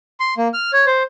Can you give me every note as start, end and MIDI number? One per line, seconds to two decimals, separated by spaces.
0.20 0.34 84
0.38 0.48 58
0.54 0.71 89
0.73 0.85 73
0.86 1.03 72